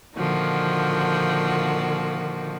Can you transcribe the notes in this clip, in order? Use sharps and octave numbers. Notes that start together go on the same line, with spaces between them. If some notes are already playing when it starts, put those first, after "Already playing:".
A#2 D3 D#3 F3 F#4